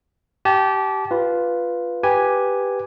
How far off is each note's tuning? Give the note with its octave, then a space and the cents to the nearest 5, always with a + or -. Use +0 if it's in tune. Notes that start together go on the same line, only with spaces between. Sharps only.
G4 -20 A5 -30
F4 +0 B4 +0
G4 +0 B4 +0 G#5 +0